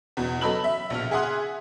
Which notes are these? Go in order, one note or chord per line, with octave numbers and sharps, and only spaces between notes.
E2 B2
F#3 A4 D#5 B5 E6 F#7
E5
A#1 B2 F6
G#4 E5 F#5 C6 D#6 F#6